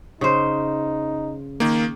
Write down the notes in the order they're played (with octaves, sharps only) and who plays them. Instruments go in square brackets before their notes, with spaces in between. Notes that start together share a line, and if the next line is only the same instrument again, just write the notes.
[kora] C#3 C5 [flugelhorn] D#4
[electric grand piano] D#3 A#3